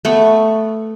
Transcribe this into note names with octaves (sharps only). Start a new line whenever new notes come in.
A3 B3 C#6